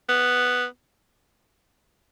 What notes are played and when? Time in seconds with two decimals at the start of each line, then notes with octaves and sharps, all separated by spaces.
0.09 B3